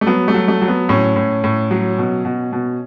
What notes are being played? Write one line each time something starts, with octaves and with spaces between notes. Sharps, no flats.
A3
F#3 B3
A3
F#3
A3
F#3
B3
A2 C#4
A2
A2
F#3
B2
B2
B2